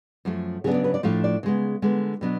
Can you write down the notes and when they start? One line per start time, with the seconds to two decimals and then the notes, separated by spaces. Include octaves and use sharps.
0.25 F#2 F3 A3
0.64 C#3 F#3 B3 D4 G#4
0.74 D5
0.84 B4
0.94 D5
1.03 A2 F3 A3 D4 F5
1.24 D5
1.43 C#3 G#3 B3
1.82 D3 G#3 B3
2.21 B2 F#3 B3 D4